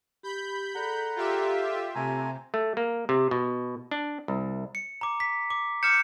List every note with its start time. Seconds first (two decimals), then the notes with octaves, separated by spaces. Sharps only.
0.23 G4 B5 G6
0.75 G#4 A4 D5 F#5 A#5
1.16 F4 G4 E5
1.95 C3 A3 G#5 A#5
2.54 A3
2.77 A#3
3.09 C3
3.31 B2
3.91 D4
4.28 C2
4.75 C#7
5.01 A#5 D6
5.20 B6
5.50 D6
5.83 D6 F6 G6 C#7 E7